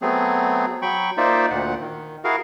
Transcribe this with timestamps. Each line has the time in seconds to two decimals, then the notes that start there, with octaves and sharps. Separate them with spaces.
0.02 F#3 A3 B3 C4 G#4
0.82 F#3 G5 B5 C#6
1.18 A#3 D#4 F4 C5 D5 E5
1.50 D2 A#2 F#5
1.80 D#3
2.24 E4 F#4 G#4 A#4 F5